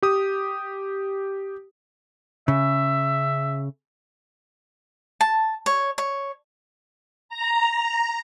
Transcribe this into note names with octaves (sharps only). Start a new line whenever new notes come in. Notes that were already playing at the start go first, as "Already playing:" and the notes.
G4 D#6
C#3 E5
A5
C#5
C#5
A#5